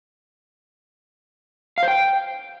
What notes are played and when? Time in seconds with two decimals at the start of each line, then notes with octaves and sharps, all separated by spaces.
1.78 F5
1.83 C5
1.88 G5